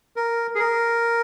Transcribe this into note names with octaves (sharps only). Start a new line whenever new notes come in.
A#4
G#4
A#4